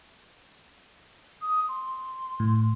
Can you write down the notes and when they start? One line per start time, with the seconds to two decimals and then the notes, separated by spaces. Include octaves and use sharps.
1.42 D#6
1.69 C6
2.40 A2